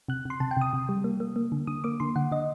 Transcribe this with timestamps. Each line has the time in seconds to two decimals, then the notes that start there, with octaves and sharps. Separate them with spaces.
0.08 C3 F#6
0.25 C3 C6
0.40 C3 A5
0.51 G5
0.57 C3 D#6
0.73 C3
0.89 G3
1.04 A#3
1.20 A#3
1.36 A#3
1.52 D3
1.67 D3 D#6
1.84 A#3 D6
2.00 D3 C6
2.16 D3 F#5
2.31 D3 D#5